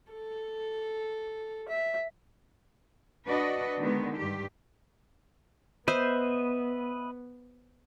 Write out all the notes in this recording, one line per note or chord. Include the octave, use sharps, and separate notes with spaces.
A4
E5
D4 F#4 B4 D5 D#5
D3 D#3 G#3 B3
G2 G4
B3 B4 C5 D#5 E5